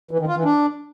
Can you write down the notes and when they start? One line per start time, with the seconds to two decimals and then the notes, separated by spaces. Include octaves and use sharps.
0.11 E3
0.19 D#3
0.28 F4
0.36 E3
0.44 D4